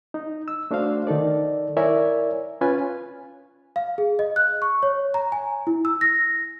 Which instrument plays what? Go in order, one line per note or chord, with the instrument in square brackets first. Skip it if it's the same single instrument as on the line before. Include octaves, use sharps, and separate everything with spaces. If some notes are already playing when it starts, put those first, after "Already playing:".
[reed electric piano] D#4
E6
A3 D4 F#4 C5 F5
D#3 D#4 A4 D5
E4 A#4 C#5 D5 E5 G#5
C#4 F4 B4 G#5
[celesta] F5
G#4
D#5
F#6
C#6
C#5
A#5
G#5
E4
E6
A#6